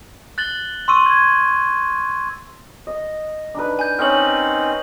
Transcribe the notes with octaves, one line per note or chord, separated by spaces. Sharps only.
F#6 A6 F#7 G7
C6 C#6 E6 D#7
G#6
D#5
D4 D#4 B4
G#5 G6
C4 C#4 D#4 C#5 D#5 G5 F6 F#7